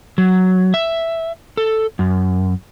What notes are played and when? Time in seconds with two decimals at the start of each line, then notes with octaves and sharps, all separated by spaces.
0.18 F#3
0.74 E5
1.57 A4
1.99 F#2